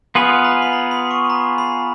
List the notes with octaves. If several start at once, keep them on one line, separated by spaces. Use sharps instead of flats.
B3 F4 G#4 B4 F6
A#5
B5
A#5
B5
C#6
A#5
B5